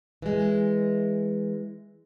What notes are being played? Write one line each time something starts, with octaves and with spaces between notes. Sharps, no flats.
E3 G#3